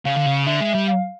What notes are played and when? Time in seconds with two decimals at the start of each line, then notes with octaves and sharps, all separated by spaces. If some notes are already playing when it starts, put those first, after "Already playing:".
0.05 C#3 F5
0.16 D3
0.26 C#3
0.47 D3 E5
0.61 G#3
0.75 G3
0.88 F5